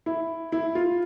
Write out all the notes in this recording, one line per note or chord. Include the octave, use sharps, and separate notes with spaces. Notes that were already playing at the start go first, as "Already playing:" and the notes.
E4
E4
F4